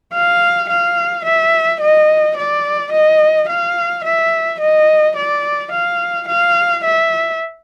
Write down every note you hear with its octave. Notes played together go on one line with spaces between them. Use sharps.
F5
F5
E5
D#5
D5
D#5
F5
E5
D#5
D5
F5
F5
E5